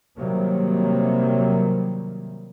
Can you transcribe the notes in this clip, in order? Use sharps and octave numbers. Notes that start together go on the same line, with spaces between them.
C3 D#3 F#3 G3 A#3